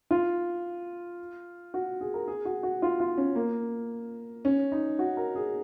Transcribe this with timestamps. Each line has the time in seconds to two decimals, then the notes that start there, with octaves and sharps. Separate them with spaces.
0.11 F4
1.74 F#4
2.01 G#4
2.14 A#4
2.28 G#4
2.45 F#4
2.63 F#4
2.82 F4
3.00 F4
3.17 C#4
3.36 A#3
4.45 C#4
4.72 D#4
4.99 F#4
5.17 A#4
5.35 G#4